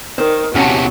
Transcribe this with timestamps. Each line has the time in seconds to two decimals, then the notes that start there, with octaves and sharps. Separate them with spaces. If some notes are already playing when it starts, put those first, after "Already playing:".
0.18 D#3 C5
0.55 E2 C3 F#3 C#4 F#5 A5